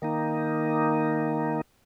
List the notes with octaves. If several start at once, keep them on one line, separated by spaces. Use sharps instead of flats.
D#3 A#3 D#4